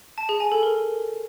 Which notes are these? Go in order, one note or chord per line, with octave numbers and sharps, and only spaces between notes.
A5
G#4
G#5
A4
A#4